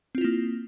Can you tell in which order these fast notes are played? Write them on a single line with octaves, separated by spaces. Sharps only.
C4 F4 E4 A#3